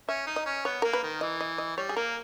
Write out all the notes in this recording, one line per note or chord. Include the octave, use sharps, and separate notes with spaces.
C#4 E5
D#4
D#5
C#4
B3 C#5
A#3 A#4
B4
D#3
E3 D#5
D#5
D#5
G3 C#5
G#4
A#3 A#4